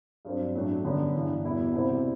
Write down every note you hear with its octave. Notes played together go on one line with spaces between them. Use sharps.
G2 F#3 C4
A2 F#3 A3 D4
F#2 D3 G3 B3
G2 E3 B3
E2 B2 G3 B3 E4
C2 B2 G3 C4 E4